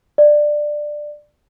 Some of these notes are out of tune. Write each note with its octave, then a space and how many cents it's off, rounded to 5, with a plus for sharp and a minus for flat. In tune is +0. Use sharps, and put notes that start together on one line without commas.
D5 +15